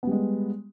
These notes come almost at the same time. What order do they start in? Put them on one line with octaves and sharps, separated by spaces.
B3 G3 G#3